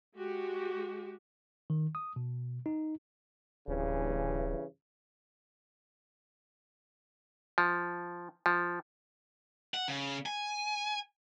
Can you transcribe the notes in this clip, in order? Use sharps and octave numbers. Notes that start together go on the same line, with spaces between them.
G#3 F#4 G4
D#3
D#6
B2
D#4
D1 G2 C#3 E3
F3
F3
F#5
C#3
G#5